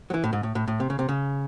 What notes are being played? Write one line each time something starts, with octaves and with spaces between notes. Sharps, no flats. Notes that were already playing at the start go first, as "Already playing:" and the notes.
F#3
E3
A2
G#2
A2
A2
A2
C3
C#3
C3
C#3